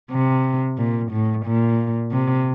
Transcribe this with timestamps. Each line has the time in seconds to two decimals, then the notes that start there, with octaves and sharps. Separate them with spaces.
0.11 C3
0.77 A#2
1.11 A2
1.45 A#2
2.12 C3